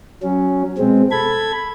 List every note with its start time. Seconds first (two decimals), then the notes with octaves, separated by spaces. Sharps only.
0.23 F#3 C#4
0.78 B2 G#3 C4
1.11 A4 B5 G#6